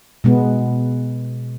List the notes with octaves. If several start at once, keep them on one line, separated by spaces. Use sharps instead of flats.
B2 G#3 B3